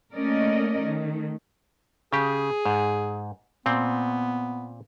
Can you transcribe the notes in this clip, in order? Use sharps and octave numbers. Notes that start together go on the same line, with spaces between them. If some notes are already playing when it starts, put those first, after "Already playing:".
A3 A#3 C#4 A#4 D5 D#5
D#3 A3
C#3 G4 G#4
G#2
A#2 B3 C4